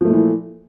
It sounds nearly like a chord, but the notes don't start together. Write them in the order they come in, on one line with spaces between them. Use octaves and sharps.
F3 A3 A#2 E3